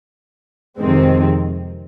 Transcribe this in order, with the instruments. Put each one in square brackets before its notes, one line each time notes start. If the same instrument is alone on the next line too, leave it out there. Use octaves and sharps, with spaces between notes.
[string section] F2 C3 D#3 G#3 C4